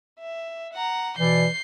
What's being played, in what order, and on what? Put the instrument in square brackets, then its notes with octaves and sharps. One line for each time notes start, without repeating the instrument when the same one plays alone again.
[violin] E5
F#5 A#5
[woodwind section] B2 E3 D5 [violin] G6 C7